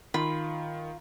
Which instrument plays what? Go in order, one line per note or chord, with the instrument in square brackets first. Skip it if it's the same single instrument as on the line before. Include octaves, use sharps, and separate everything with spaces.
[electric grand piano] D#3 [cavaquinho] F4 B5